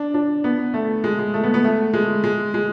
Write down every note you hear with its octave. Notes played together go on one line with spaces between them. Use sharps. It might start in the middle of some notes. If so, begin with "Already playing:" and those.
Already playing: D4
D4
B3
A3
G#3
G#3
A3
B3
B3
A3
G#3
G#3
G#3